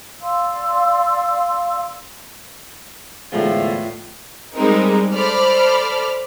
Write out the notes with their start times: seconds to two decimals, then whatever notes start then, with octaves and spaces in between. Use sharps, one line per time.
0.21 D5 F5 C6 E6
3.32 E2 A2 D3 F3 G#3 A3 F4
4.54 G3 G#3 C4 D#4 A#4
5.15 A4 C5 D5 B5 F6